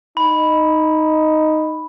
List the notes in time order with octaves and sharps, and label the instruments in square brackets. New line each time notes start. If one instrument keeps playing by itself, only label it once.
[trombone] D#4 [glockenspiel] B5